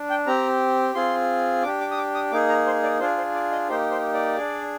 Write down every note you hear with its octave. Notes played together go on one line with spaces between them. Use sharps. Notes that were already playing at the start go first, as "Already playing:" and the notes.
Already playing: D4
G5
C4 G4 A#5
C4 F4 G#4 C6
D4 G4 D6
D6
D#6
D6
D#6
A#3 D#4 G#4 D6
A#5
C5
D5
D4 F4 G#4 C5
C5
D5
D#5
A#3 D#4 G4 C5
C5
D5
D4 G#4